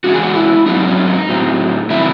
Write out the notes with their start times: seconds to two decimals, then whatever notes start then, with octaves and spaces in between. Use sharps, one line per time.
0.04 E2 C#3 G#3 C#4 F#4
0.13 G#4
0.22 F#4
0.35 E4
0.66 G#2 F#3 C4 D#4
0.87 C#4
1.07 D#4
1.29 A2 F#3 C4
1.90 C3 D#3 F#3 A3 E4